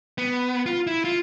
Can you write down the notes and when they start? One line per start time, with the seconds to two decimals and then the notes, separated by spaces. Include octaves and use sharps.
0.18 B3
0.66 F4
0.87 E4
1.04 F4